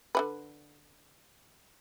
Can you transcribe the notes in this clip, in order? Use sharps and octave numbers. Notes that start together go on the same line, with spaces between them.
D3 G#3 B4